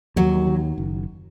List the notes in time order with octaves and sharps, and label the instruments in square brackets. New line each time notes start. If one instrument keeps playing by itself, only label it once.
[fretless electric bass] D#2 [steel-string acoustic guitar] F#3
[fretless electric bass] D#3
F#1